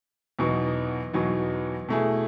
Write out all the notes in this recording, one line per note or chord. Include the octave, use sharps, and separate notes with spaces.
E2 B2 F#3 B3 D#4
E2 B2 F#3 B3 D#4
B2 A3 E4 G#4